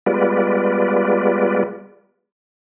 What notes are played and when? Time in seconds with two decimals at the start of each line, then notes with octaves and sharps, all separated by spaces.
0.06 G3 G#3 B3 F4 B4 D5